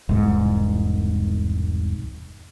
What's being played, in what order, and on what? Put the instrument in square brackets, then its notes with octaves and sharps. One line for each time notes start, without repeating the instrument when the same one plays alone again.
[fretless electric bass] E1 C2 G#2